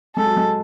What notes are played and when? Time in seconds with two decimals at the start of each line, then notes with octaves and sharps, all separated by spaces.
0.16 G#3 A4
0.26 F#3
0.37 G#3